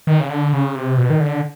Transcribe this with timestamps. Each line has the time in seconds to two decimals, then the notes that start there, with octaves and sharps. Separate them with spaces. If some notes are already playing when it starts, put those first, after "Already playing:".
0.07 D#3
0.20 C#3
0.30 D3
0.53 C#3
0.75 C3
0.98 B2
1.10 D#3
1.21 D3